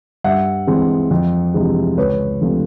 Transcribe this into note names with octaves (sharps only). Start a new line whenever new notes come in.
G2 E5 F#5
E3 G#3 C4
F2
C3 E3 G#3
C#2 B4 C#5
C3 F3 A3 C4